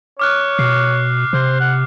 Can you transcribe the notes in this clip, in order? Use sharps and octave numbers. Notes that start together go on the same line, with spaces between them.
C#5 D6 F6 F#6
B2 C7
C3 C5
F#5